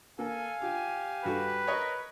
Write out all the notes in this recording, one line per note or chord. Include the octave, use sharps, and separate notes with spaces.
A#3 A4 F5 G#5
F4 G4
G2 F#4 A4 B4
A#4 C#5 D#5